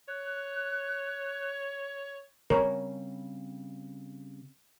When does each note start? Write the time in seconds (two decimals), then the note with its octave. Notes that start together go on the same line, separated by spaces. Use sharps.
0.09 C#5 F#6
2.50 C#3 G3 C4 A#4 C#5